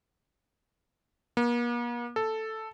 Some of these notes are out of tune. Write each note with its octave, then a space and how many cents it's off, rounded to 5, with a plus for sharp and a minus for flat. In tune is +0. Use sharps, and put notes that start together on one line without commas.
A#3 +45
A4 +0